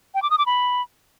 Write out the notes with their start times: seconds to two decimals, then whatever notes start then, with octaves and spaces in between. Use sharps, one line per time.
0.15 G5
0.23 D6
0.30 D#6
0.38 D6
0.46 B5